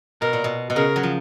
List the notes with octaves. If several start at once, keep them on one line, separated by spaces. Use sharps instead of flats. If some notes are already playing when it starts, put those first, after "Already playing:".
B2 A#4
A#2
B2
B2
C#3 A#4
F#3
F3